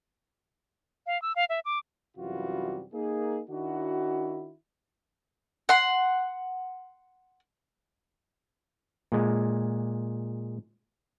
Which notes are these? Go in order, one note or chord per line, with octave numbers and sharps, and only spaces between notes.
F5
E6
F5
E5
D6
F#2 C3 E3 G3 F4 F#4
A#3 D#4 G#4
D#3 D4 E4 F#4
F#5 C6
A#2 G#3